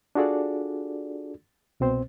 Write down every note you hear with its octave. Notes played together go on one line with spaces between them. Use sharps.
D4 F4 F#4 G#4 A4 D5
C2 B2 C4 C5